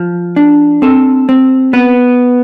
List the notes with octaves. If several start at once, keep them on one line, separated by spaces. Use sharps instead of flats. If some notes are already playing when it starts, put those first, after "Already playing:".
Already playing: F3
D4
C4 A4
C4
B3 B4